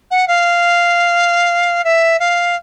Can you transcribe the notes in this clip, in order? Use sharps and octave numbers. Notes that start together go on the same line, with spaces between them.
F#5
F5
E5
F5